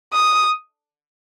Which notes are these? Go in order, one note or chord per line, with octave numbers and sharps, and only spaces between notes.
D#6